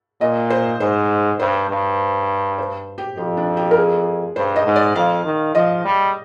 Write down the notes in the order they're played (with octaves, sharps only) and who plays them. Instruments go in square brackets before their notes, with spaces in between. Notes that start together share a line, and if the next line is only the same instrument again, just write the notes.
[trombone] A#2 [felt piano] D#5
[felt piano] C5
[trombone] G#2 [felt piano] C5
[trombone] G2 [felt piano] C5
[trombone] G2
[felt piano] C5
G4
[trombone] F2 [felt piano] G4
[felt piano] D4
G4
A#4
G#4
[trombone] G2 [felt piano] C5
[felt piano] D#5
[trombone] G#2
[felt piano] D5
[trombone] F2 [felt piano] F5
[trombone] D#3
[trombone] F3 [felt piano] D#5
[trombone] G3